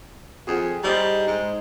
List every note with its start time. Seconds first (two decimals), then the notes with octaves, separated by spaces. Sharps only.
0.47 F2 G#4 G5
0.84 G3 D#4 C5 A#5
1.27 G#2